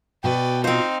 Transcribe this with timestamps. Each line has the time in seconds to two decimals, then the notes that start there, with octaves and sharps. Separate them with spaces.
0.24 B2 F#4 B4 D5 G5
0.64 C4 D#4 F4 C5 F5